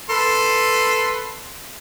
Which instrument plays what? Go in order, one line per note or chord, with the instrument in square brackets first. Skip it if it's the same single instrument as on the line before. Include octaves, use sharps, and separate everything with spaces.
[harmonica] A4 B4 C6